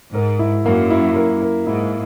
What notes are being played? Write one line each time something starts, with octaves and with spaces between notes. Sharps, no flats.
G#2 A#4
E4
F#2 A#3
E4
A#4
A#4
G#2 E4